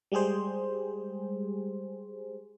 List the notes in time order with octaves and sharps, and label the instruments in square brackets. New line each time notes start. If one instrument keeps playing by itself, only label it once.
[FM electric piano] G3 G#3 G4 G#4 C5